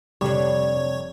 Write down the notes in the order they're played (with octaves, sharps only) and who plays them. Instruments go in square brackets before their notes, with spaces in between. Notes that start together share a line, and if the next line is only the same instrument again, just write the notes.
[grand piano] F1 C3 [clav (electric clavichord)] G3 [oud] D4 A4 [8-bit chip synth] C#5